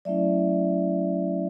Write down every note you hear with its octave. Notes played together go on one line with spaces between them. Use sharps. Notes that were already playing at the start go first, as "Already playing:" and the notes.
F#3 A3 C#4 E4 D5 E5